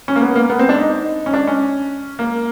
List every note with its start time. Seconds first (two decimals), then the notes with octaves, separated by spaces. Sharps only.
0.08 C#4
0.16 A#3
0.22 B3
0.36 A#3
0.50 B3
0.59 C4
0.69 D4
0.77 D#4
1.26 C#4
1.33 D4
1.47 C#4
2.19 A#3